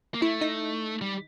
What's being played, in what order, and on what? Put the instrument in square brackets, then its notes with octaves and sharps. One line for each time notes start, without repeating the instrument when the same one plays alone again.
[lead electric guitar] A#3
[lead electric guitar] A3 [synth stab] E4
[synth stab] D#4
[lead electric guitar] G3